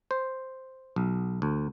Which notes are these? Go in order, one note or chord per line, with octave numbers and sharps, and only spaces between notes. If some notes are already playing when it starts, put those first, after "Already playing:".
C5
B1
D2